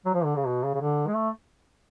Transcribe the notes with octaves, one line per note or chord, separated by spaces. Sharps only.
F#3
F3
D3
C#3
B2
C#3
C#3
D3
G#3
A3